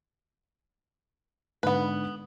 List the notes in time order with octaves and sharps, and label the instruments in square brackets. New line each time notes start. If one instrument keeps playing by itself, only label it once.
[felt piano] G#2 D3 [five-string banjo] B3 B4